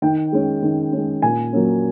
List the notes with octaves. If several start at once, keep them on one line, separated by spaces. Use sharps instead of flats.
D#3 G5
G#3 C#4
D#3
G#3 C#4
A#2 G#5
F#3 A#3 C#4